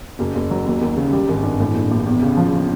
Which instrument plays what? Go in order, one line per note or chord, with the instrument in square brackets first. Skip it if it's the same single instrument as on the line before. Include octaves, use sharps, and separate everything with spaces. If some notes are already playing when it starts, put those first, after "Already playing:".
[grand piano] F#1
F#1
F#3
D#2
D#2
C#3
G3
G#1
G2
A2
A#1
A#1
E2
C#3
F3